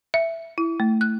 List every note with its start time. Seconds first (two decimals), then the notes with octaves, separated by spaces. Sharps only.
0.14 E5
0.58 E4
0.80 A3
1.01 F#6